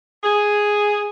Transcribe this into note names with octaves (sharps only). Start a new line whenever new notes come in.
G#4